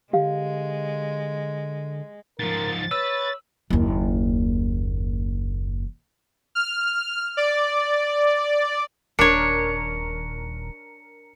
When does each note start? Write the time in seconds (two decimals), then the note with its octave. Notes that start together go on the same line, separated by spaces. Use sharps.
0.13 D3 G#3 G4 F5
2.39 G#2 F3 A#4 A6
2.91 B4 C#5 E6
3.70 F#1 D#2
6.55 F6
7.37 D5
9.19 D#1 D4 A#4 C#5 C#7